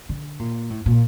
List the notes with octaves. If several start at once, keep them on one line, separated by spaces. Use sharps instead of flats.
D3
A#2
A2
A#2